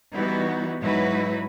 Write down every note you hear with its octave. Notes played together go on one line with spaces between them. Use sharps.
E3 G3 B3 D#4 E4 F#4
G#2 F#3 D#4 E4 F#4 B4